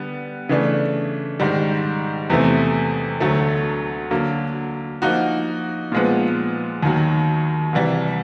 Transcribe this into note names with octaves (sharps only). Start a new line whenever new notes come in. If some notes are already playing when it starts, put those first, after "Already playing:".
Already playing: D3 G3 B3
C#3 E3 A3 D4
G#2 D#3 G3
E2 C3 E3 A3 C4
D2 D3 F#3 A3
D3 F#3 A#3
F3 A#3 D#4 F#4
A#2 F3 G#3 B3
D#2 D#3 F#3
C2 C3 E3 G3